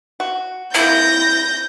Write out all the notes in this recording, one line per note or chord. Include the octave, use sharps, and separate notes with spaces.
F#4
C3 A#3 E4 G6 A#6